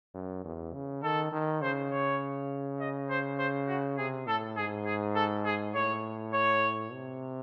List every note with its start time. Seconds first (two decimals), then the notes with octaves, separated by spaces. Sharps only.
0.14 F#2
0.45 E2
0.74 C#3
1.03 D#3 A4
1.32 D#3
1.62 C#3 C5
1.91 C#5
2.80 D#5
3.10 C5
3.39 C5
3.68 F#4
3.98 C3 G#4
4.27 A2 A4
4.57 G#2 G#4
4.86 G#4
5.16 A4
5.45 G#4
5.75 A2 C#5
6.34 C#5
6.93 C3